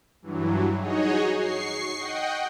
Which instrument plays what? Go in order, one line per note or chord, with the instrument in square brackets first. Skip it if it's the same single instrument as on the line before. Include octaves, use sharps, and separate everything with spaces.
[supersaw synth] G2 E3 F#3
D#4 F#4 G#4 C#5 D#5
C#6 C7
D#5 F#5 G5